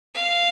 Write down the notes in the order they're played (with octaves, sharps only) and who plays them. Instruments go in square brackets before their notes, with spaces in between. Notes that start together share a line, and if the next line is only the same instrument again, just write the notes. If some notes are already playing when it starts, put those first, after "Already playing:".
[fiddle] F5